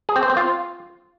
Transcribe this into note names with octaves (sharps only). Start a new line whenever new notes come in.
G#4
C4
C5
C4
F4